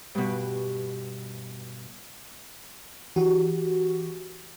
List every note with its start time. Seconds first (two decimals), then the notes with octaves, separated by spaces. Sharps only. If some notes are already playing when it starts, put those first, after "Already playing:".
0.15 G2 B2
3.16 E3 F#4 G4